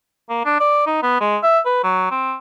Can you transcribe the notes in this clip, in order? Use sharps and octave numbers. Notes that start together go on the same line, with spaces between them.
A#3
D4
D5
D#4
B3
G#3
E5
B4
F#3
C4